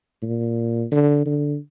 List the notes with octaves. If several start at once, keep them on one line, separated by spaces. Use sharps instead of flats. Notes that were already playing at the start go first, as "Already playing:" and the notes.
A#2
D3
D3